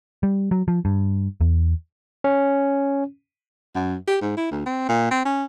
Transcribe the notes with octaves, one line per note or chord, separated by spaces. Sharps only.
G3
F#3
F3
G2
E2
C#4
F#2
G4
G#2
E4
D2
C4
A#2
C4
C#4